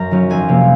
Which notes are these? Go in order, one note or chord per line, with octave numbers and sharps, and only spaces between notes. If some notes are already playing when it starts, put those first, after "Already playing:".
Already playing: F#2 A#5
D#3 F#3 C#4
F2 G#5
C3 F3 A#3